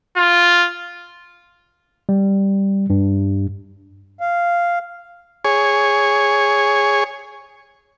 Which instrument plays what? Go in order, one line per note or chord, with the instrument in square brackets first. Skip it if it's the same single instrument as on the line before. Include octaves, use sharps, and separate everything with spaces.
[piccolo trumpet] F4
[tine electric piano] G3
G2
[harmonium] F5
[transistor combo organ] G#4 C#5